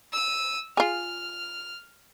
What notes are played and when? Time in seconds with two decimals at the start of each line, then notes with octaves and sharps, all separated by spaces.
0.12 E6 D#7
0.77 F4 G#4 F6